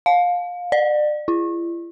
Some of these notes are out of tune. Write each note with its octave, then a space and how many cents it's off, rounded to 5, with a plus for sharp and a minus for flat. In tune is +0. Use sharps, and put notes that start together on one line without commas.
F5 +25
D5 +35
E4 +45